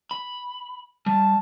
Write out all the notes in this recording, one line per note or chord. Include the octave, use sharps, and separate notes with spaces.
B5
G3 A5